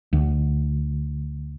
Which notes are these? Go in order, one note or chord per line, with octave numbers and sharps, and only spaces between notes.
D2